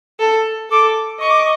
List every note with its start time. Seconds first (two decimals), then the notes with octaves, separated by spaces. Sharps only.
0.20 A4
0.70 A4 D6
1.20 D#5 C#6
1.29 D6
1.38 C#6